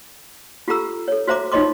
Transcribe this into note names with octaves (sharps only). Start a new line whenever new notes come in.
F4 G4 A4 A#5 E6
A4 C#5
F#4 C5 E5 A#5 D6
D#4 F4 C#5 D#5 C6 D6